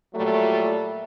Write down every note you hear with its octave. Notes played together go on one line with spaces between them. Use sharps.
A#2 F#3 G3 A3